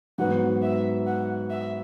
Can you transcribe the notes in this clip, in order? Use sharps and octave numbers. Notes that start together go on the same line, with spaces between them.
G#2 F#3 B3 F#5
E5
F#5
E5